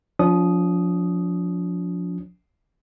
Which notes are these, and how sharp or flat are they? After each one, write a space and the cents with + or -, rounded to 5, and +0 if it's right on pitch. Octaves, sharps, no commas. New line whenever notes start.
F3 +20 D4 -40 D#6 +0